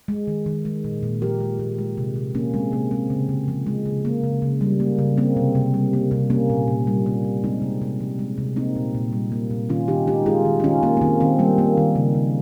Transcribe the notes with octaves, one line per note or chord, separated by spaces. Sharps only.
G#3
D#3
D#3
G#3
A#2
A#2
F3 G4 A#4
G#3
A#2
G#3
C3
C3
F3 A#3 C#4
G#3 C4
C3 A#3
G#3 C4
C#3
C#3
F3
G#3
C#3
A#3
C#3
C#3
G3
A#3
C#3
A#3 C4
C3
C3
G3
A#3
C3
A#3 C#4
A#2
A#2
G3
A#3
A#2
G#3 C4 D#4
C3
C3
F3
G#3
C3
A#3 C4 D#4
A#2
A#2
G3
A#3
A#2
D#3 C#4 F4
D#3 D#4 G4
G#3 D#4 G4
G#3 F4 G#4
D#3
D#4
D#3 C#4 F4
A#3 C#4
A#3
D#3 C4
D#3 C4
G3 A#3
A#3
D#3
C#3
C#3